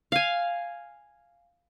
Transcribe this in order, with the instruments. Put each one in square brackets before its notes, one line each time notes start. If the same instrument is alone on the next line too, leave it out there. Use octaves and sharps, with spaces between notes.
[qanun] F5 G#5